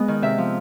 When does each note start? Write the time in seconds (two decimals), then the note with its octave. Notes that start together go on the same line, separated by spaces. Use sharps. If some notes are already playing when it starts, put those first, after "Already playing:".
Already playing: G#3 B3 D#5
0.08 D#3
0.22 C3 E5
0.38 F3